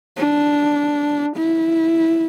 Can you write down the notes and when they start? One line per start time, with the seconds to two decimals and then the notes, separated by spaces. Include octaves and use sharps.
0.17 D4
1.37 E4